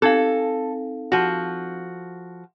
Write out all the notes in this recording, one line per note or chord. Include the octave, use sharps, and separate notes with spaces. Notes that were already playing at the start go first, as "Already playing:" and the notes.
C4 D#4 A4 F5
F3 F#4